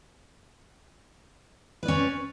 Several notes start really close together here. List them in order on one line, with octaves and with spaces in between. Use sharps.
B4 D5 C#4